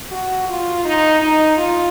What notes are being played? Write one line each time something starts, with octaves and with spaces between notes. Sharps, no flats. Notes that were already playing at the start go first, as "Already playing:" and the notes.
F#4
F4
D#4
D#4
F4